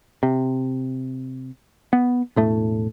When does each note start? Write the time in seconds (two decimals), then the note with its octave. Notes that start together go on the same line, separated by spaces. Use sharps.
0.23 C3
1.93 B3
2.36 E1 A2 A3